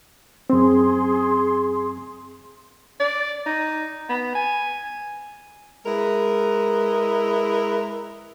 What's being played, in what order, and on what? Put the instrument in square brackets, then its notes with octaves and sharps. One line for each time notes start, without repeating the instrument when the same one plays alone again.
[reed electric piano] F#2 C4 [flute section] G#4 C6
[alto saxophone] D5
D#4
B3
G#5
[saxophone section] G#3 E4 A#4 B4 D#5